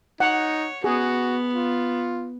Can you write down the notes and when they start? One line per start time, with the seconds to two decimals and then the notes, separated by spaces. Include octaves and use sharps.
0.20 D#4 C#5 F#5
0.84 B3 F#4 G#4
1.54 F4